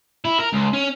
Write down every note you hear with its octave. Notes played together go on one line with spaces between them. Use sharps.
E4
A#4
C#2
C#4